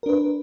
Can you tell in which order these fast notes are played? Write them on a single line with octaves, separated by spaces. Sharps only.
A#4 D4 B4